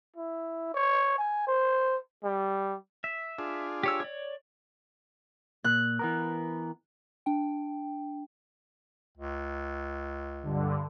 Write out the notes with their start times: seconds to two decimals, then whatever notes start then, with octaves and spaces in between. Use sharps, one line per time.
0.17 E4
0.74 C#5
1.18 G#5
1.47 C5
2.24 G3
3.04 E5
3.38 D4 F4 G#4
3.83 G4 C#5 E6
4.00 C#5 D5
5.64 A#2 F#6
5.99 E3 B3 A#4
7.26 D4 G5
9.18 C#2
10.43 G2 D3